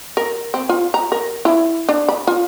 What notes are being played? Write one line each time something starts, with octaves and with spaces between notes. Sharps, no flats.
A#4
C4
F4
A#5
A#4
E4
D4
B5
F4